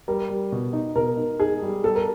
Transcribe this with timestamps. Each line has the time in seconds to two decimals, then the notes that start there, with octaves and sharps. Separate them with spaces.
0.08 G3 A#4
0.30 G3
0.52 B2
0.73 D#4
0.95 B2 A#4
1.17 D#4
1.40 D#4 G#4
1.62 G3
1.83 G3 A4
1.95 A#4